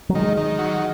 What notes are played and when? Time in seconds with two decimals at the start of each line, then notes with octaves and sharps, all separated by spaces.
0.09 F#3
0.15 D#3 G#3
0.37 D#3
0.59 F#3